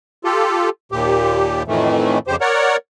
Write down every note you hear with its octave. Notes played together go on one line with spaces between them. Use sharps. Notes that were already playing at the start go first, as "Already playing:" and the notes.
F4 G4 A4
D#2 A#2 G4
F2 A2 D#3 E3 A3
F2 C#3 G4 C5
A#4 C#5 D5 F#5